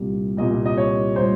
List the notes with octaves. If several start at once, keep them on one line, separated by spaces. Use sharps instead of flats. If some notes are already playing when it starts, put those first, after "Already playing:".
Already playing: C2 A#2 G3
C2 A#2 G3 D#5
D#5
C#5
A#2 G3 C5